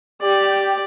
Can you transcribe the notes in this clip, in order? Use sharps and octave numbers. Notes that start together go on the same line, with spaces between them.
G4 D5